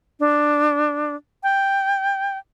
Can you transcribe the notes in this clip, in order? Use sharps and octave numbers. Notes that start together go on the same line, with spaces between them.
D4
G5